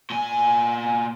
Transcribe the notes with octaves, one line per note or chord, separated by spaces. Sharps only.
A#2 G#5